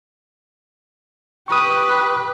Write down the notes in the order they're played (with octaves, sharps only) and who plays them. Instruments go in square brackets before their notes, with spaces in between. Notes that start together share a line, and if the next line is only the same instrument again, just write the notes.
[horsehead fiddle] G4 B4 [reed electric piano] C#6 D#6